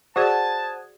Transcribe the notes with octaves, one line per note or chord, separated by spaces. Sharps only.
F#4 G#4 C5 D5 F#5 A5 D#6 G#6